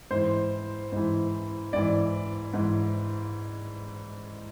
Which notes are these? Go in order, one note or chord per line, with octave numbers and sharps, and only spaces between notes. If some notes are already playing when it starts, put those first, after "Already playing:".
G#2 E3 C5
G#2 E3
G#2 E3 D5
G#2 E3